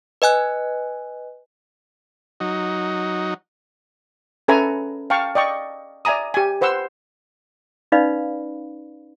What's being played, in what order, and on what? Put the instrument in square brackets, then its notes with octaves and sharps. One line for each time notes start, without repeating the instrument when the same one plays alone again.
[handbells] B4 D#5 G#5 F#6
[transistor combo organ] F#3 D#4
[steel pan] C#4 A4 B4 E5 G#5 A#5
F5 G5 A5 C#6
D5 D#5 G5 C#6
D5 E5 G#5 A#5 D#6
G4 G#5
B4 C5 F#5 C6 E6
[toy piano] C#4 D#4 B4 D5 F5 B5